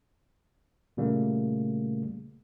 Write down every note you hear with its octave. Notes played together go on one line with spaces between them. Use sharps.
A#2 C#3 G3 A3 A#3